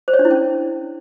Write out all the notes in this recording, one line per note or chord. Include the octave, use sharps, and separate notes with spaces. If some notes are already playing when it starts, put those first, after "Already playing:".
C5
C#5
D4
E4
C#4